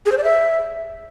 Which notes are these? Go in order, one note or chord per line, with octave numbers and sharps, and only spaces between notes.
G#4
C5
D5
E5